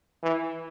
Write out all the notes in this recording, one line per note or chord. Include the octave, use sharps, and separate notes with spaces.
E3